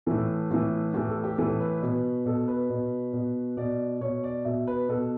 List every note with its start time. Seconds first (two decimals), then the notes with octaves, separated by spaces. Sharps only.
0.06 A2 E3 A4
0.51 A2 E3
0.94 A2 E3 G4
1.09 A4
1.24 G4
1.38 A2 E3 A4
1.60 B4
1.82 B2
2.26 B2 A4
2.48 B4
2.70 B2
3.13 B2
3.57 B2 D5
4.01 B2 C#5
4.24 D5
4.45 B2 E5
4.67 B4
4.89 B2 A4